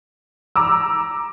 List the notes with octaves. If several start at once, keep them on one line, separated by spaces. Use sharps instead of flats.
A#5 D6 E6